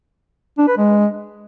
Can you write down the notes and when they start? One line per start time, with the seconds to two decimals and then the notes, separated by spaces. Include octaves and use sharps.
0.58 D4
0.68 B4
0.77 G#3